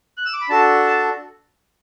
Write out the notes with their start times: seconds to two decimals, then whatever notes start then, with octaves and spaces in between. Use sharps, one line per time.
0.17 F#6
0.26 E6
0.33 D6
0.41 B5
0.49 D4 F#4 A4 A5
0.87 A5